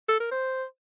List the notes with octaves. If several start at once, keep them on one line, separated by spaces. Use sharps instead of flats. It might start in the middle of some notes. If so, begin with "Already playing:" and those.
A4
A#4
C5